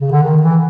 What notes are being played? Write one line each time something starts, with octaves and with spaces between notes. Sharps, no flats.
C#3
D3
D#3
E3